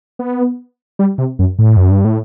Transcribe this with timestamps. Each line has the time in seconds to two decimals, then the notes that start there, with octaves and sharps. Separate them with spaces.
0.19 B3
0.99 G3
1.18 C3
1.39 F#2
1.59 A2
1.77 F#2
1.90 G2
2.05 A2